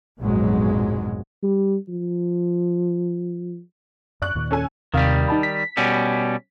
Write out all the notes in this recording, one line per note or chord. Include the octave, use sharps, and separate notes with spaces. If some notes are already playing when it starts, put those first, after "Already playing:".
A#1 F2 G#2 B2 F#3 G#3
G3
F3
F#2 D5 C#6 F#6
D#2 A#2 D#3
C#4 A4 G#5
D#2 C3 D#3 G3 F5
D#4 A5 B5
B6
B2 G3 C#4